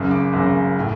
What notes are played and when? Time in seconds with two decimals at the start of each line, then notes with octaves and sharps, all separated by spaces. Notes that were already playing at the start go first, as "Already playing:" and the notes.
Already playing: G#1 F#2 C#3
0.11 D6
0.33 G#1 F#2 C#3
0.79 A2